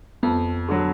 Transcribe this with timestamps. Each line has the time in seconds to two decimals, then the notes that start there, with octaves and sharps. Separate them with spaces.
0.23 F2 B3
0.69 D3 F#3